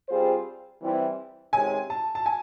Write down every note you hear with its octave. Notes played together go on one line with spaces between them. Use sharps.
G3 C4 F4 G#4 C5
C3 E3 G3 C4 E4
C3 D#3 G#3 C#4 G#5
A5
A5
G#5